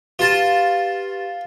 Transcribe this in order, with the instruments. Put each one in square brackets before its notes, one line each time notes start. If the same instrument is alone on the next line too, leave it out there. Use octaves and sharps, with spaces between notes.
[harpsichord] F4 A5 [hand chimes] G4 B4